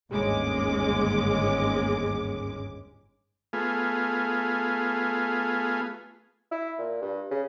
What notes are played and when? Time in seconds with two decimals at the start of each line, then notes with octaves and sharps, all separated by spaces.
0.11 G1 D#2 G#2 G#3 C#4 D6
3.53 A3 B3 F4 G#4
6.52 E4
6.79 A#2
7.01 G2
7.31 C#3